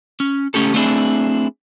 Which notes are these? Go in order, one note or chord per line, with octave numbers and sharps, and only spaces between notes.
C#4
C#2 A3 C#4 G4 A4
A3 B3 C4 D4 E4 G#4